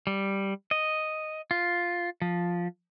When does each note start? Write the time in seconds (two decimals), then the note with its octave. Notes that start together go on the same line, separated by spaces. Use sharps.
0.07 G3
0.71 D#5
1.51 F4
2.22 F3